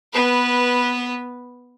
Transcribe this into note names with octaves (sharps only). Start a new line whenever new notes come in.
B3 B4